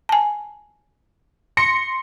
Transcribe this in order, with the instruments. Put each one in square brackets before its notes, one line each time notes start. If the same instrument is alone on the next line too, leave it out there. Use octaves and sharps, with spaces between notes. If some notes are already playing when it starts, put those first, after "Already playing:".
[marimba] G#5 A5
[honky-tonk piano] C6 A#6 C#7